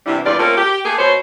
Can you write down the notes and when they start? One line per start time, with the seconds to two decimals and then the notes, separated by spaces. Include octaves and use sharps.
0.06 C3 E3 G3 B3 D4 E4
0.25 E2 G2 A#2 F4 D5
0.39 A3 A#3 C4 C#4 F4 A#4
0.57 G4
0.85 A3 A#3 G4 G#4
0.98 B2 C5 C#5